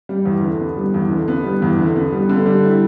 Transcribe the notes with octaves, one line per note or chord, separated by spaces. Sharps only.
G3
E2
D3
B3
G3
E2
D3
B3
G3
E2
D3
B3
G3
D3
G3
E4